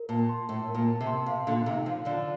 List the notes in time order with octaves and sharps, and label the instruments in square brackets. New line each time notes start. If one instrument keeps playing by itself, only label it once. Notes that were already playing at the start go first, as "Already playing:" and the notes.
Already playing: [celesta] A#4
[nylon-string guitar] A#2 [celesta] A5
[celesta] C6
[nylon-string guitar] A2 [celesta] A5
[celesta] A#4
[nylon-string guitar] A#2
[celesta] A5
[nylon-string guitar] C3
[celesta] C6
[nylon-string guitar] C3 [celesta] F5
[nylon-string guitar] A#2 D3 [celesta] F5
[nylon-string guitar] C3 D#3 [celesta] D#4
[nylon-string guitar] D3 F3 [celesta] F5
[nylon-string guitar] D3 F3 [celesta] D5